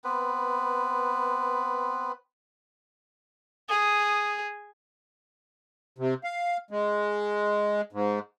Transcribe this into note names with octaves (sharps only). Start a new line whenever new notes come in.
B3 C4 B4
G#4 D#6
C3
F5
G#3
G#2